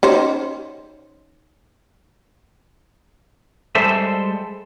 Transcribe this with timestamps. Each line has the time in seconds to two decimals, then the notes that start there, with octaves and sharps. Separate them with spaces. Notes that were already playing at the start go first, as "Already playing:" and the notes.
0.03 C#4 D#4 C5
3.75 G3 G#3 A4 C5 E5